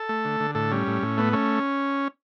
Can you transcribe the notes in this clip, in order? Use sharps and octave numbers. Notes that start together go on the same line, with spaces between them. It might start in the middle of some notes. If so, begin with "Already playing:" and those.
Already playing: A4
A3
D3
D3
A2 A4
G3 C#4
A2
A2
A3 B3
A3 C#4